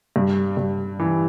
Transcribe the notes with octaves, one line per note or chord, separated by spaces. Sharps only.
G2
G2
E3